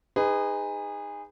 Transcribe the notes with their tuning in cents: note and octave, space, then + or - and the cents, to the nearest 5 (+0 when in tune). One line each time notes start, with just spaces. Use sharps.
D#4 +0 G#4 -25 B4 +20